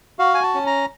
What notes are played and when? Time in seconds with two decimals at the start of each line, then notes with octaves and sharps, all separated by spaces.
0.19 F#4 F5
0.34 G#5
0.43 A5
0.54 C#4
0.66 A#5